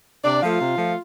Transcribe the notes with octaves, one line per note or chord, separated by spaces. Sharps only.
C3 D4 D5
F3 A3 F4 F5
C3
F3 A3